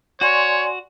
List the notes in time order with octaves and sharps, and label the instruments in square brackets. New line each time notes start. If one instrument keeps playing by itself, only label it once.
[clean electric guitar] F#4 [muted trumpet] C#5 [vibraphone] D5 G#5 C6